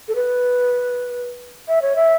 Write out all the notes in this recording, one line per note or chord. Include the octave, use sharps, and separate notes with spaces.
A4
B4
E5
C#5
E5